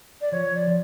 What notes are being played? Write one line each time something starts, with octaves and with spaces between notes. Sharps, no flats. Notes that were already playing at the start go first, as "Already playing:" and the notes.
D5
F3 C#5
D5
F3